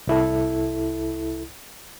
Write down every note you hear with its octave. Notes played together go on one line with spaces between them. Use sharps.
C2 E4 A4